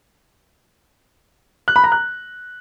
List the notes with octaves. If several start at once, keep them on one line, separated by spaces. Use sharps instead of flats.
F#6
B5
A#5
F#6